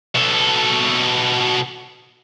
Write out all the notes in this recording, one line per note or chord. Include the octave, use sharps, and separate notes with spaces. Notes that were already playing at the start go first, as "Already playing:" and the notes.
B2 A4